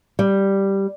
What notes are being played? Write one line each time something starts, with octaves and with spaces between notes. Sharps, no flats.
G3